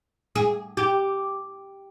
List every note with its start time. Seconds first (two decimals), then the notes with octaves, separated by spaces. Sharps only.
0.36 G#4
0.77 G4